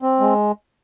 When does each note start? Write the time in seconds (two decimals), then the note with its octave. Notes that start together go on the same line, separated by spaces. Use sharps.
0.02 C4
0.20 G#3